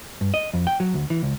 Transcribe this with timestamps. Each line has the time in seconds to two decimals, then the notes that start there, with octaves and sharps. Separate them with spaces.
0.21 G2
0.34 D#5
0.54 F2
0.67 G5
0.80 F#3
0.94 D2
1.10 E3
1.23 C#2